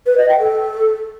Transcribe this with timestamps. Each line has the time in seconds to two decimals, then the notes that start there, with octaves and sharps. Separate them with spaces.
0.06 B4
0.18 D#5
0.29 G5
0.40 A4